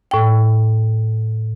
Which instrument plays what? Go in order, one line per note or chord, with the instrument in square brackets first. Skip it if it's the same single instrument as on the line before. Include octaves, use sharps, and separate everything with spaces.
[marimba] A2 G5